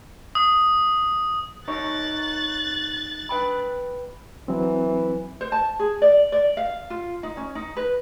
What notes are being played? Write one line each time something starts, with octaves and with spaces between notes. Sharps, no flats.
D#6
D#4 A#4 C#5 F#6 A6
B4 G5 B5
E3 F#3 C4
C5
A5
G#4
D5
D5
F5
F4
D#4
C#4
D#4
B4